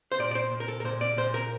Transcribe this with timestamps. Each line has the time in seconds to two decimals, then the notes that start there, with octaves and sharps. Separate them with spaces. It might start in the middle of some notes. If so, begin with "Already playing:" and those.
0.12 C5
0.19 A#2 D5
0.31 D5
0.35 C5
0.52 A#2
0.60 A#4
0.68 A4
0.80 A#4
0.85 A#2 C5
1.01 D5
1.17 A#2 C5
1.34 A#4